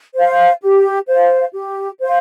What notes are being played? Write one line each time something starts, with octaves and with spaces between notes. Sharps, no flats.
C5 F5
G4
C5 F5
G4
C5 F5